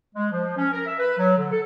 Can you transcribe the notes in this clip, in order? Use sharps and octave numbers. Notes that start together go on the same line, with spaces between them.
G#3
F3
C#4
A#4
E5
B4
F#3
D3
A4